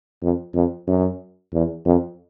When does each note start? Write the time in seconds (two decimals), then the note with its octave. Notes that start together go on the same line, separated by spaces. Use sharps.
0.22 F2
0.54 F2
0.88 F#2
1.53 E2
1.85 F2